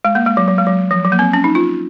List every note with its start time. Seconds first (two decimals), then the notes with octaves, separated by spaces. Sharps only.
0.05 G#3
0.15 A#3
0.26 G#3
0.37 F#3
0.48 F#3
0.58 G#3
0.67 F#3
0.91 F3
1.05 F#3
1.12 A#3
1.19 C4
1.33 C#4
1.44 D#4
1.55 F4